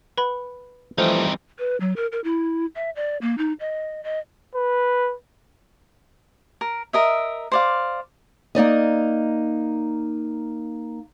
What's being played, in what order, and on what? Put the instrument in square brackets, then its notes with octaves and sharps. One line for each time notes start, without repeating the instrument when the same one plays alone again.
[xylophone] B4 B5 [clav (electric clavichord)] F#5
[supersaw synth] E3 G3 [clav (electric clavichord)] F3 A3 [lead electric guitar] C4 D#4 [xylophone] C5
[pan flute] B4
F#3
A#4
A#4
E4
E5
D5
A#3
D#4
D#5
D#5
[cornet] B4
[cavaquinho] A#4
A#4 D#5 E5
C5 D5 F5
[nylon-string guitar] A#3 D#4 D5 D#5